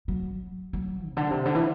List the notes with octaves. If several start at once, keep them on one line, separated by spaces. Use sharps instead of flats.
F#3
F#3
C3
D3
C3
D3
E3